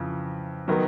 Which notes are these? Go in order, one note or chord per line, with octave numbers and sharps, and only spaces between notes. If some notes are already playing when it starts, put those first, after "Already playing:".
Already playing: F2 C#3 E3
D#3 F#3 B3